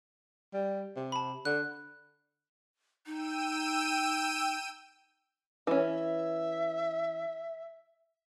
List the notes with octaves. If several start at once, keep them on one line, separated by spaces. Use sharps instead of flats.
G3
C3
A5 B5
D3 F#6
D#4 G5 E6 D#7
E3 C#4 E5